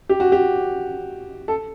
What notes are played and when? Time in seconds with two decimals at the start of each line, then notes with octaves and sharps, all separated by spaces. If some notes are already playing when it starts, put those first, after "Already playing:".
0.09 G4
0.20 F#4
0.32 G4
1.48 A4